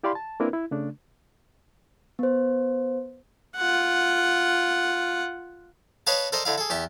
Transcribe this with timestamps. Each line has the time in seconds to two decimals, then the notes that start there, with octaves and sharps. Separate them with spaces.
0.03 E4 G4 D5 F5 B5 C6
0.15 A5
0.40 A#3 C4 D4 E4 A#4 B4
0.53 E4
0.71 C#3 A3 D4
2.19 B3 C5
3.57 F4 F#5
6.07 B4 C#5 D#5 F5 A5
6.32 A4 A#4 C5 D5 D#5
6.45 D3 E4 F5
6.58 G#4 A4
6.70 E2 G4 E5